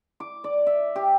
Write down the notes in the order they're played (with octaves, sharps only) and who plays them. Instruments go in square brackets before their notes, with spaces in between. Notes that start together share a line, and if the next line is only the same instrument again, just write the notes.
[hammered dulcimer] D6
D5
E5
G4